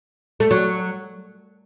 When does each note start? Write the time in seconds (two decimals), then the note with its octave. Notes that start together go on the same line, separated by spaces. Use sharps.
0.40 A3
0.51 F#3